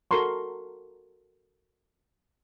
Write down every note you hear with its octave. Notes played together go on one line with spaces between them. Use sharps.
F#4 A4 A#4 A#5 C6 C#6